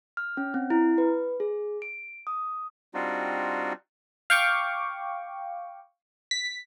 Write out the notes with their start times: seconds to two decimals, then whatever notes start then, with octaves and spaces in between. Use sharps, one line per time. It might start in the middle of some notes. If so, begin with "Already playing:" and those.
0.17 F6
0.37 C#4
0.54 C4
0.70 E4
0.98 B4
1.40 G#4
1.82 D7
2.27 D#6
2.94 G3 C4 D4 D#4 F4 F#4
4.30 F5 G5 C#6 D6
6.31 B6